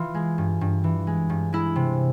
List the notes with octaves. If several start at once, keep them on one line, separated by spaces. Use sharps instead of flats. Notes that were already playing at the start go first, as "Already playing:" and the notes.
Already playing: E3 F4
G#3
G2
G2
E3
G#3
G2
G#3 E4
C3